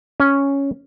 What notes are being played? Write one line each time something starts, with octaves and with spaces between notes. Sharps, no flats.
C#4 G#5